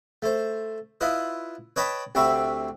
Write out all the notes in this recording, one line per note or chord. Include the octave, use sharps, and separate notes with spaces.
A3 C5
E4 F4 B4 D#5
B4 C#5 D#5 G5 A5 B5
D2 C3 C4 E5 B5 C#6